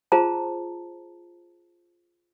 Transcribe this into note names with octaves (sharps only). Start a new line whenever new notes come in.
F4 G#4 C5 A5 A#5